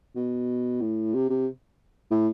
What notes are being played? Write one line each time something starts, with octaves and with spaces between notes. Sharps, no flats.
B2
A2
C3
C3
A2